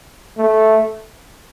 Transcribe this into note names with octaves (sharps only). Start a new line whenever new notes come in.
A3